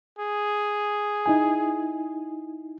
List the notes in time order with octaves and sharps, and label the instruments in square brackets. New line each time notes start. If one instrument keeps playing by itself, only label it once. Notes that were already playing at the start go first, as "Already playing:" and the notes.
[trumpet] G#4
[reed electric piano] D#4 E4 G#5